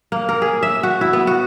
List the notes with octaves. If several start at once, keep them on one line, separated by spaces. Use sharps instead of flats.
A#3
A#4
G#4
E5
F#4
E4
B3
F#4